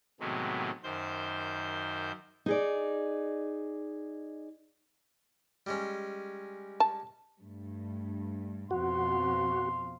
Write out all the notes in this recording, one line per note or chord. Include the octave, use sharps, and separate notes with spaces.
A2 C3 D#3 F#3 G#3 B3
F#2 D#3 C5 G6
D#4 G#4 D5
G3 G#3 C#4
A5
G2 A3
F2 B2 F#4 F5 C6